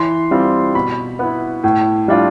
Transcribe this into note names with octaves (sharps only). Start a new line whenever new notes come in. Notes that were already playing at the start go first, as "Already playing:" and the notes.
Already playing: E3 C6
G3 C4 F4
B2 B5
B3 E4
A2
G3 D4 F4